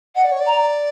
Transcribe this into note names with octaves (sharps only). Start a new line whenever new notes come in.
D#5 F#5
D5
C#5
D5
A#5